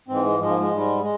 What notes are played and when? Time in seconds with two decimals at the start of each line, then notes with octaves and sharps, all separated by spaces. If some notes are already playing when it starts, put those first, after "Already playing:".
0.08 G#2 E3 G#3 C4
0.24 G#3
0.39 G#2 F3 G#3
0.50 A#3
0.60 G#3
0.71 G#2 G3
1.01 G#3